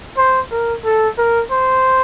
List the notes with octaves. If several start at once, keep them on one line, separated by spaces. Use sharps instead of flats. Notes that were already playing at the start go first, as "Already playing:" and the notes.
C5
A#4
A4
A#4
C5